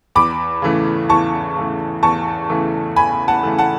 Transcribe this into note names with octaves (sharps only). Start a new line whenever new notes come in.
E2 B5 D6
C#3 E3 A3
E2 A5 C#6
C#3 E3 A3
E2 A5 C#6
C#3 E3 A3
E2 G#5 B5
F#5 A5
C#3 E3 A3
F#5 A5